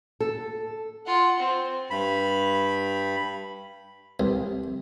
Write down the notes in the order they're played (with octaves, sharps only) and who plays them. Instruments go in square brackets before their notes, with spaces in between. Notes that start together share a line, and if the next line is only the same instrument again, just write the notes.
[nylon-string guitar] A4
[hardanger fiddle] F4 F#5
C4
[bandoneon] G2 B5
[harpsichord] C2